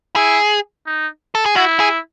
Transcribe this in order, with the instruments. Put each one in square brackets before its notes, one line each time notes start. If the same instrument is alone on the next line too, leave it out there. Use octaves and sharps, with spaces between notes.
[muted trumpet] E4 [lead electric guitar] G#4
[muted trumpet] D#4
[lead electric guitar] A4
G#4
[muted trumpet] E4 [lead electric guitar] F#4
[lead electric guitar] G#4